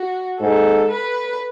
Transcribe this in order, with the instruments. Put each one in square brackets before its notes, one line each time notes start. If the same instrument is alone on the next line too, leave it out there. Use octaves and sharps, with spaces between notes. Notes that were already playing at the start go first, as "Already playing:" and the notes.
Already playing: [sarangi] F#4
[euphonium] G#2 [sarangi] A4
[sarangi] B4